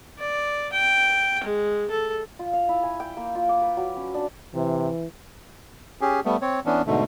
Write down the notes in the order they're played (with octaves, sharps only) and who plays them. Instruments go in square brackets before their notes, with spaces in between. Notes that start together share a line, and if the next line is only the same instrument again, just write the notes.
[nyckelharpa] D5
G5
G#3
A4
[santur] F4
F5
E4
G#5
G5
A#3
F4
D6
B4
F#3
C#4
D4
[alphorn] C3 [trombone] E3
[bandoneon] C#4 G4 G#4
G3 A3 B3
C4 C#5
E3 B3 C#4 D4
G#2 B2 D3 A3